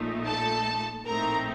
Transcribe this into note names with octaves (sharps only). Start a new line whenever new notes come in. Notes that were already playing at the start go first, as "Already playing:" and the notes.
Already playing: A#1 A#2 A3 D#4
A4 A5
A#1 A2 A3 C4 D#4 A#4 A#5